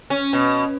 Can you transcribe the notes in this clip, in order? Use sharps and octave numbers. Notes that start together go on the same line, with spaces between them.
C#4
B2